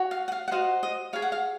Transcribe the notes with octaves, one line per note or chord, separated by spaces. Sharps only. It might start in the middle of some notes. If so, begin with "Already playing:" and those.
Already playing: F#4 C#5
F5
F#5
F5
F#5
F#4 C5 D#5 F5
D#5
G#4 C#5 F5
F#5
F5